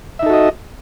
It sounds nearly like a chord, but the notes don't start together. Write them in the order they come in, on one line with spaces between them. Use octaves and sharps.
E5 D#4 A4 F#4 D#5